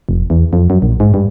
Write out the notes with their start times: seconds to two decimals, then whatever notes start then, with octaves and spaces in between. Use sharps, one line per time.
0.09 F1
0.30 E2
0.53 F2
0.70 F#2
0.82 A#1
1.00 G#2
1.14 G2